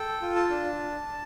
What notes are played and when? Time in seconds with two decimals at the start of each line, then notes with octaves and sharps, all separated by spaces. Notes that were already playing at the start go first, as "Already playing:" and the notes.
Already playing: A4 G5
0.22 F4
0.36 A5
0.50 D4